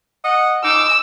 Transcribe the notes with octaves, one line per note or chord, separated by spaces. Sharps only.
D#5 F#5
D#4 D6 E6